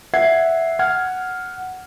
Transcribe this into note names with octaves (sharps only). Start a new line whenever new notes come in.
E5 F#5 G#6 C7
F#5 F6 G#6